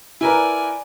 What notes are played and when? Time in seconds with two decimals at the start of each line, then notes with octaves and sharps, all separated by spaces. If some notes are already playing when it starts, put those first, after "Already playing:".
0.21 E4 A#4 B4 D5 G#5